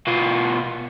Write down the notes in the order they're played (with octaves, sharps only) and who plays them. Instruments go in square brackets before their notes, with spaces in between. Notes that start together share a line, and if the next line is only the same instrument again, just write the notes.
[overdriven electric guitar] B2 F4